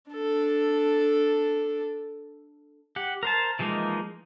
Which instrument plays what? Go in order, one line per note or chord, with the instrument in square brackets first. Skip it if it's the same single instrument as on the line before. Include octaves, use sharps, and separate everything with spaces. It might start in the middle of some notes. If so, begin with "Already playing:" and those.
[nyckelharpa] D4 A4
[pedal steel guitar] G4 F#5
A#4 C5 A5
E3 F3 G#3 A#3 D#4